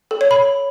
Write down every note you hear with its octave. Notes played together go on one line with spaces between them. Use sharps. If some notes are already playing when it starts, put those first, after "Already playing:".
A4
C#5
B5